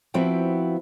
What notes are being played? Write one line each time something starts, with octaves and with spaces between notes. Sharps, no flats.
F3 B3 C4 E4 F#4 G5